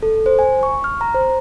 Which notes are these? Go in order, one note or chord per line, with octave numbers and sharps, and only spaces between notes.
A4
C5
G#5
C#6
F6
A#5
C5